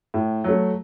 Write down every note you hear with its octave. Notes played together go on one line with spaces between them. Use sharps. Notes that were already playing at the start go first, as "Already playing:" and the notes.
A2
F#3 A3